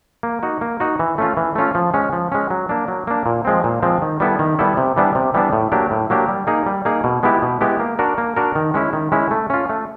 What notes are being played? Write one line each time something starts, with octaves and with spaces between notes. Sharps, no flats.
A#3
D#4 F#4
A#3
D#4 F#4
E3
A3 C#4 F4
E3
A3 C#4 F4
F3
G#3 C#4
F3
G#3 C#4
F#3
A#3 D4
F#3
A#3 D4
A#2
F3 G#3 C4
A#2
F3 G#3 C4
D#3
G3 B3 E4 A4
D#3
G3 B3 E4 A4
C3
E3 G3 B3 D4
C3
E3 G3 B3 D4
A2
F#3 A#3 D4 G4
A2
F#3 A#3 D4 G4
G3
A#3 D#4 G#4
G3
A#3 D#4 G#4
B2
G#3 B3 E4 G4
B2
G#3 B3 E4 G4
A#3
D4 F#4 A#4
A#3
D4 F#4 A#4
D#3
G#3 C#4 E4
D#3
G#3 C#4 E4
A3
C#4 F4
A3